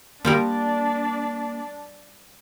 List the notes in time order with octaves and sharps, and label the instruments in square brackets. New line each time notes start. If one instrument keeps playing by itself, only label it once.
[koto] F3 G3 A#4 [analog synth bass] A#3 [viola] D4 D5